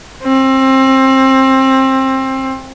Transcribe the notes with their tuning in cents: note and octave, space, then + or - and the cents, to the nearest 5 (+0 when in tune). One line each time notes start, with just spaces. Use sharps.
C4 +25